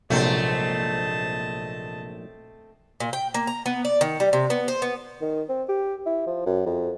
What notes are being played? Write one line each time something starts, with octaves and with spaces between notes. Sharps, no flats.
A#1 G#2 C3 F#3 A3 C4 D#5 A5
A#2
G5
A#3
A#5
B3
D5
D#3
G3
C3
B3
C5
B3
D#3
C4
G4
E4
F3
F#2
F2